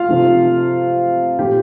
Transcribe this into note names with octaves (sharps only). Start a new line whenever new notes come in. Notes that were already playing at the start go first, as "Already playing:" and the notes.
Already playing: F4 F5
C3 F3 A3
A#2 F3 A3 G4 G5